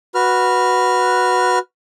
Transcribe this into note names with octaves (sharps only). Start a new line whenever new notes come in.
F#4 B4 F6